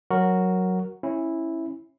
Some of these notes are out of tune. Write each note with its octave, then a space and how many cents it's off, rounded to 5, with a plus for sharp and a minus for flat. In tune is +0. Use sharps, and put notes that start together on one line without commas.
F#3 +0 F#4 +0 A#4 +0
C#4 -20 E4 -5